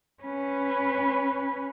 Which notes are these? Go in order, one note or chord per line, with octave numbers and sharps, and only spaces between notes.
C#4 B4